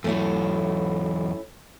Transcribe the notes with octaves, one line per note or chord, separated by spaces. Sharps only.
E2 F#3 A3 C#4 E4